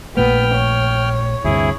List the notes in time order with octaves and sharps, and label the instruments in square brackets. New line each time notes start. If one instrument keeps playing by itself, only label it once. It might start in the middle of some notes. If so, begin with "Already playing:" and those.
[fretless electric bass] A#1 A#2 A3 [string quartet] B3 [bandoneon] G5 F6
[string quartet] C#5
[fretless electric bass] D2 G2 C3 [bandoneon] E4 G#4